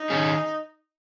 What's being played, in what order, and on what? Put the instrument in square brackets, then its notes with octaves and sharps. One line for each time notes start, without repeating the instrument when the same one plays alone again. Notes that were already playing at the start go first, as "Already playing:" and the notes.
Already playing: [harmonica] D#4
[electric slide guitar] D#3 C#4 G#4